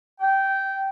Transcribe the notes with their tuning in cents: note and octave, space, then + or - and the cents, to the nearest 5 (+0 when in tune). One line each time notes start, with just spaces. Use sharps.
G5 -15